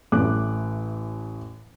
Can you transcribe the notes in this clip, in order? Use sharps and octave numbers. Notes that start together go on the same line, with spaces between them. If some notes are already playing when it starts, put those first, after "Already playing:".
A1 A3 D6 F#6